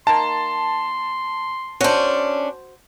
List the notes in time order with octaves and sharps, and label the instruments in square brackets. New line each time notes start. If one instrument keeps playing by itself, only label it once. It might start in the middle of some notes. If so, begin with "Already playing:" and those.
[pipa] D#3 A#3 [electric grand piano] A5 [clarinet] C6
[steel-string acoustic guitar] C#4 D4 [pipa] F#4 C5